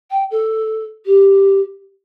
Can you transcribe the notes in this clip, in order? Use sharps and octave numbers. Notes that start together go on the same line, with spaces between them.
G5
A4
G4